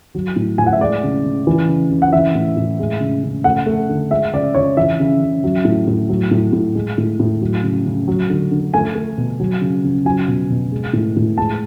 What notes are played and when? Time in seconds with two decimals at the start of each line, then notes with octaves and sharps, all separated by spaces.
0.15 F#3
0.36 A2
0.58 A2 G#5
0.67 F#5
0.73 E5
0.81 G#3 D5
1.03 C#3
1.24 C#3
1.47 E3
1.69 C#3
1.91 C#3
2.02 F#5
2.13 E3 E5
2.35 A2
2.57 A2
2.79 G#3
3.00 C#3
3.24 C#3
3.44 A3 F#5
3.66 A3
3.89 D3
4.11 G#3 E5
4.33 C#3 D5
4.54 C#3 C#5
4.77 E3 E5
5.00 C#3
5.22 C#3
5.44 F#3
5.65 A2
5.87 A2
6.09 F#3
6.31 A2
6.53 A2
6.75 G#3
6.98 A2
7.20 A2
7.41 F#3
7.63 C#3
7.86 C#3
8.08 F#3
8.30 D3
8.51 D3
8.74 A3 G#5
8.95 A3
9.18 B2
9.40 F#3
9.61 C#3
9.84 C#3
10.05 F#3 G#5
10.28 B2
10.50 B2
10.72 G#3
10.93 A2
11.16 A2
11.38 G#3 A5